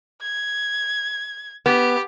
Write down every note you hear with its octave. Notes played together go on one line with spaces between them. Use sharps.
G#6
B3 G4